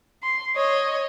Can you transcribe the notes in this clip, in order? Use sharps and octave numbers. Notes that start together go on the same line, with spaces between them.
C6
C#5 D#5